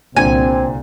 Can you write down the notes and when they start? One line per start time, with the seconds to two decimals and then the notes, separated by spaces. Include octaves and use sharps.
0.16 C2 A#2 D3 C4 G#5